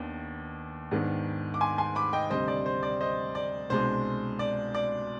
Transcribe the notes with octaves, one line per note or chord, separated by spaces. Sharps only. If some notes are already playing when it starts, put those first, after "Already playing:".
Already playing: D#2 D#3 B3 D4
G#2 D#3 B3 D4
D6
G#5 C6
G#5 C6
B5 D6
D#5 G5
D2 C3 G3 C5 D#5
D5
C5
D5
C5 D#5
D5
C2 B2 G#3 D4 C5
D5
D5